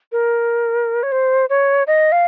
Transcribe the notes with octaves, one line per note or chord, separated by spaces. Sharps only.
A#4
C#5
C5
C#5
D#5
F5